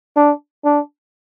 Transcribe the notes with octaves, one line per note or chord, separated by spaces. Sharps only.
D4
D4